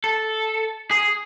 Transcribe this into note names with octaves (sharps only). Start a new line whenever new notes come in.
A4
G#4